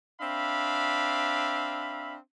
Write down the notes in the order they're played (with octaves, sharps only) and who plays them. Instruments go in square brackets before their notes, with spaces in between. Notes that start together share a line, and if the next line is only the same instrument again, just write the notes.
[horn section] C4 D4 E5 F5 B5